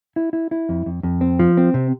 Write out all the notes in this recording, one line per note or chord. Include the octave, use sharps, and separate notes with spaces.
E4
E4
E4
F2
F2
F2
C4
F3
C4
C3